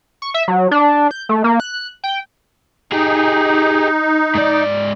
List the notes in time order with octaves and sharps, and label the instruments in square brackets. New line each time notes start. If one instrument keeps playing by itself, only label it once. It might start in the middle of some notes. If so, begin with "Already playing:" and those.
[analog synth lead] C#6
E5
F#3
D4
G6
A3
A#3
F#6
G5
[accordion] D#4 [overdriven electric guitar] G4 G#4
[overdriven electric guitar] G#2 D5